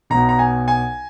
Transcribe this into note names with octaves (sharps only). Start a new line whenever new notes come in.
B1 B2 A#5
A#5
G#5
G#5